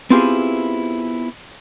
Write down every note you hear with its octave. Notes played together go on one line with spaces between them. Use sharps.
B3 C4 E4 F4 G4 G#4